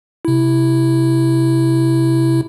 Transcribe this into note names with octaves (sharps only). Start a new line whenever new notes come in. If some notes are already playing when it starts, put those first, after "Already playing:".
C3 E4